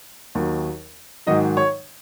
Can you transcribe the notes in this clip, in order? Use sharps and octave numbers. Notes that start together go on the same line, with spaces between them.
D#2 D#3 F#3
G#2 D#3 F#3 D#5
C#5